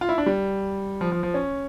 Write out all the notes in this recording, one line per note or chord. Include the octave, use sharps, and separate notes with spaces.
F4
E4
D4
G3
F3
F3
F3
C#4